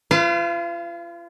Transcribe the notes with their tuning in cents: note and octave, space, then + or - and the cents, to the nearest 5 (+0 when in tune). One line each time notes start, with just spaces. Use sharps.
F4 -35 B4 +40 F5 +0